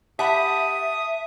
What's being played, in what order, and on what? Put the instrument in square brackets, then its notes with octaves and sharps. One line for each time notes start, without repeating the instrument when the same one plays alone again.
[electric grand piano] G4 F#5 B5 [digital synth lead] E5 [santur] A5 [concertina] D#6